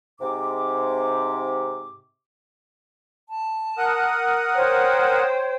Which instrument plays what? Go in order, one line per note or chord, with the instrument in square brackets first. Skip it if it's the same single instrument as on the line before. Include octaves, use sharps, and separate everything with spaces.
[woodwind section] G#2 C3 D6
[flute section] A5
[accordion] A#4 F#5 D#6
[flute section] C5 C#5 G5